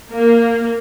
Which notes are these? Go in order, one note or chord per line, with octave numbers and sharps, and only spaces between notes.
A#3